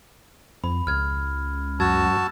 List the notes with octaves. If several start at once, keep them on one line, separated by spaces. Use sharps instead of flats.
F2 B5
C#2 F6 G#6
F#2 F#4 A5 E6 G#6 A6